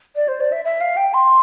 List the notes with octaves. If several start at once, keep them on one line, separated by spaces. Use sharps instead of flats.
D5
C5
D5
E5
E5
F5
G5
C6